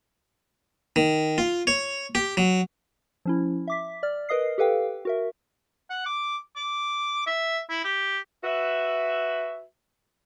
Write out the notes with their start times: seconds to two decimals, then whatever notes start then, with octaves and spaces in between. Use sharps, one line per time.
0.96 D#3
1.38 F4
1.67 C#5
2.15 G4
2.37 F#3
3.25 F3 C#4 E4
3.68 E5 D6 B6
4.03 D5 F6
4.29 A#4 B4 D#5 D#6 C7
4.58 G4 A4 B4 F5 G5
5.05 F#4 A#4 E5
5.90 F#5
6.06 D6
6.56 D6
7.27 E5
7.70 E4
7.85 G4
8.44 F#4 B4 E5